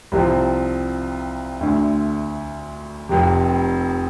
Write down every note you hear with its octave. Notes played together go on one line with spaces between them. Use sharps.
C2 C3 F3 C4
D2 D3 A3
F1 F2 C3